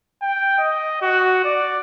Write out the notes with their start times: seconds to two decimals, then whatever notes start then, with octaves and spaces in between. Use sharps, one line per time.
0.22 G5
0.58 D#5
1.02 F#4
1.45 D5